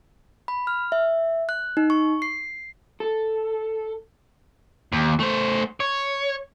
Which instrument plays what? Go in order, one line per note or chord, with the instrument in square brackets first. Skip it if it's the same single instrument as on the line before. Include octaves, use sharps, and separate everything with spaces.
[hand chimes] B5
F6
E5
F#6
D#4
C#6
C7
[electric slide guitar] A4
[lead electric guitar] D#2
A3 C5
C#5